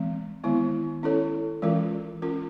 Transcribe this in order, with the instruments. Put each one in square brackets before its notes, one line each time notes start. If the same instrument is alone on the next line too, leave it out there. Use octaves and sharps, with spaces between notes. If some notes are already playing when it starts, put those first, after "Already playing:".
Already playing: [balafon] E3 G#3 C4
D#3 G#3 B3 E4
C#4 E4 A4 C#5
E3 G#3 C#4 F4 A#4
C#4 F4 A#4